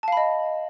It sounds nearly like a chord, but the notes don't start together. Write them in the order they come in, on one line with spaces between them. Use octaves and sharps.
A5 F5 B5 D#5